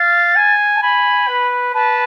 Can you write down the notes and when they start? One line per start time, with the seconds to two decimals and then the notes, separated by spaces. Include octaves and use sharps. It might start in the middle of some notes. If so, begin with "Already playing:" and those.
Already playing: F5 A6
0.36 G#5
0.76 A5
0.82 G#5 B5
1.28 B4
1.74 B4 A5